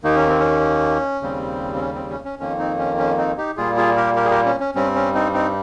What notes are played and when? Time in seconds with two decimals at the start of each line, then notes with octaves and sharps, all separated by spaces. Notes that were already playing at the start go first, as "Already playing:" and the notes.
0.04 D#2 D#3 A#3 D#4
0.16 C#4
0.28 C4
0.40 C#4
1.22 D#2 C#3 G3 C4
1.75 C4
1.80 C#4
1.95 C4
2.10 C#4
2.25 C#4
2.39 F2 D#3 A#3 C#4
2.59 C4 D#4
2.79 C#4
2.98 C#4
3.18 C4 D#4
3.38 D#4 G4
3.57 A#2 G3 A#3 F4 G#4
3.77 F4 G#4
3.97 G4 A#4
4.16 G4 A#4
4.25 G#4
4.30 G4 A#4
4.46 C#4
4.60 C#4
4.75 G2 G3 C4 C#4
4.95 C#4
5.14 C4 D#4
5.33 C4 D#4